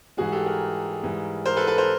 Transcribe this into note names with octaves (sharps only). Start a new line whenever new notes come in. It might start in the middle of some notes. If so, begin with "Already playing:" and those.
G#2 E3 G3 F#4 G#4
G4 A4
G#4 A#4
G#2 E3 G3
A#4 C5
A4 B4
A4 B4
A#4 C5